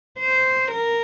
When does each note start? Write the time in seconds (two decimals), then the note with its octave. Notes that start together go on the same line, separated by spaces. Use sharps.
0.19 C5
0.71 A#4